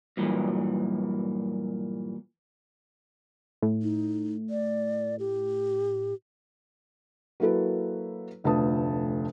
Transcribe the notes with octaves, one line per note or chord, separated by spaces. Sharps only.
G2 A#2 E3 F#3
A2
D#4
D5
G4
F#3 A#3 E4 F#4 A4 B4
F1 D2 F3 B4 A5 D#6